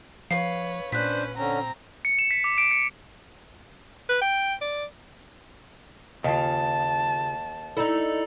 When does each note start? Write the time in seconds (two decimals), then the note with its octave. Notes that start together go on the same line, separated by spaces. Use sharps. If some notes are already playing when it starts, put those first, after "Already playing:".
0.31 F3 B4 C#5 F5
0.92 A#2 C#4 D4 B4 C5 F#6 B6
1.37 D3 C4 C#4 A#5
2.05 C#7
2.19 E7
2.31 B6
2.44 D6
2.58 D7
2.71 C#7
4.09 B4
4.21 G5
4.61 D5
6.24 D#2 C#3 F4 A5
7.77 D#4 E4 A4 D5 A#5